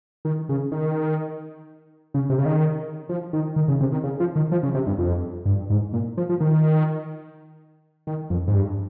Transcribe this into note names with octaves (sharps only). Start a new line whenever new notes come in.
D#3
C#3
D#3
C#3
C3
C#3
D#3
F3
D#3
D#3
C#3
C3
D#3
C#3
F3
D#3
F3
C#3
C3
G2
F2
G2
G#2
A#2
F3
F3
D#3
D#3
F2
G#2
G2